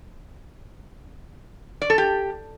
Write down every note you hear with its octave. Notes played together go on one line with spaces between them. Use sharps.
D5
A4
G4